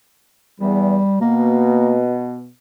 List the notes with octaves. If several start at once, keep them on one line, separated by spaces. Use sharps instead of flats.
E2 G3
B2 A#3